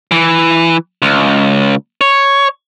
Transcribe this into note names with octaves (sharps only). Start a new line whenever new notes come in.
E3
C#2
C#5